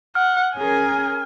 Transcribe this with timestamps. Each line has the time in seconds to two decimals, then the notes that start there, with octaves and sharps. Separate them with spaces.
0.15 F#5 F6
0.55 C#4 G#4 A#4 G#5